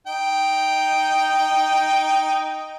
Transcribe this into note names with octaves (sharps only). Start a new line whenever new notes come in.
D#4 G5